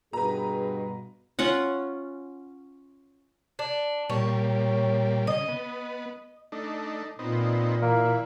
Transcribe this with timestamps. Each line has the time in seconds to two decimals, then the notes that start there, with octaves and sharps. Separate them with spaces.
0.13 G2 B2 G#4 B4 A#5
1.39 C#4 F4 F#5
3.59 D4
4.10 A#2 G3 C#5
5.27 C#3 D#5
5.48 B3
6.52 A3 D4 D#4
7.19 A#2 B3 C4 D#4
7.82 E3 A#3